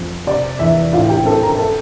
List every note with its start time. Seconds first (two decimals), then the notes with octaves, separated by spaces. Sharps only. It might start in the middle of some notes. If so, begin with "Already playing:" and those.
Already playing: F2
0.27 C3 D5
0.59 E2 E5
0.93 A2 F4 F5
1.09 G4 G5
1.25 C4 A4 A5
1.42 A#4 A#5
1.58 A4 A5